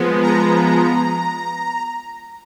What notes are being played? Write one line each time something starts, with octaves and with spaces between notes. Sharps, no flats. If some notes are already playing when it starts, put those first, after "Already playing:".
Already playing: F3 G#3 B3
A#5